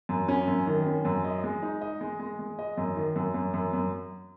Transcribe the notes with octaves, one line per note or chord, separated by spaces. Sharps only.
F#2
C#4
F#2
D#3
C#4
F#2
D#5
G#3
D#4
D#5
G#3
G#3
G#3
D#5
F#2
D#3
F#2
F#2
F#2
F#2